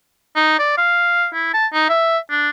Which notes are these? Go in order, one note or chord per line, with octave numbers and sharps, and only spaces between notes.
D#4
D5
F5
E4
A5
D#4
E5
D4